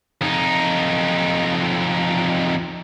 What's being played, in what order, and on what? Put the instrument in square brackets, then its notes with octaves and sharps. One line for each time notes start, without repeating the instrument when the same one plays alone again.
[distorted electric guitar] F2 D#4